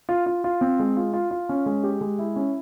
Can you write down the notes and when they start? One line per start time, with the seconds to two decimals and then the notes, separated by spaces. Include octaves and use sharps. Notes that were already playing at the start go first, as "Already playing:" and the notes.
0.09 F4
0.26 F4
0.44 F4
0.61 C4
0.79 G#3
0.97 F4
1.14 F4
1.31 F4
1.49 C#4
1.66 G#3
1.84 G4
2.01 G#3
2.18 E4
2.36 C#4